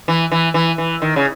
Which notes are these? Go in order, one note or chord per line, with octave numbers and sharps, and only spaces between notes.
E3
E3
E3
E3
D#3
C#3